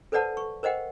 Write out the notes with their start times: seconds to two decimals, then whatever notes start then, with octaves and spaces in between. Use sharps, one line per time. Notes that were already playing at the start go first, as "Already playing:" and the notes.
0.12 A4 B4 C5 D5 F#5 A5
0.37 C#6
0.63 A#4 C5 D#5 F#5 G5